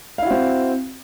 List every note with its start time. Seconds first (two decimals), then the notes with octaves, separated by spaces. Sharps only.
0.18 F5
0.22 E4
0.27 F#4
0.31 C4